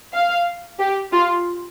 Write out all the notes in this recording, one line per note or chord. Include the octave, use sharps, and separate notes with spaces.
F5
G4
F4